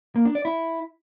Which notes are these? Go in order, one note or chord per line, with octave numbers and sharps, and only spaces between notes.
A#3
D4
D5
E4